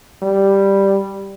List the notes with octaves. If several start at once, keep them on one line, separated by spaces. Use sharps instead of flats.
G3